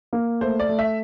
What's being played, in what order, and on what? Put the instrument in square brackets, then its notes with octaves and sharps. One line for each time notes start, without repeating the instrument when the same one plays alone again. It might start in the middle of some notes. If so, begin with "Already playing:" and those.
[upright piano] A#3
[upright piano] A3 [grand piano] C5
[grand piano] D5
[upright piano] A3
[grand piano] E5